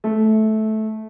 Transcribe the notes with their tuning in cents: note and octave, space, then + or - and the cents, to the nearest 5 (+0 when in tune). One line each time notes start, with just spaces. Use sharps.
A3 -15